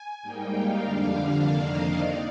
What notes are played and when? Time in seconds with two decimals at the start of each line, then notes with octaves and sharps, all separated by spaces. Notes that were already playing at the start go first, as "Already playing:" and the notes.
Already playing: G#5
0.22 G#2 G3 A#3 D#4 G5
0.52 F5
0.82 F2 D3 G3 D4 F5
1.11 F5
1.41 F2 C3 D#3 A#3 D4 F5
1.71 D#5
2.00 D#4 D5